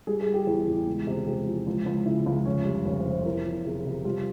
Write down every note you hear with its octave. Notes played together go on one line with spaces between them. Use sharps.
G3 G#4
G#4
G3
G4
E2 G#4
E2
C#2
C3
C#2 G4
F3
C#2
C#2
C#3 E4
C#2
F1 C#4
G3
F1 C#4
C5
F1
C5
E2 A#4
E2
C3 G#4
C3
G3 F4